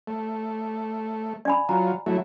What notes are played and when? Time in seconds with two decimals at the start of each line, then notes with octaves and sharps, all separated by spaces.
0.07 A3
1.45 D5 G#5 B5
1.69 F#3 F4 A#5
2.06 F#3 A3 E4